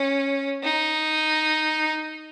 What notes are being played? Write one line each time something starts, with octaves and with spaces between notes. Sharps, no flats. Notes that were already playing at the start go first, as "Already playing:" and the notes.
Already playing: C#4
D#4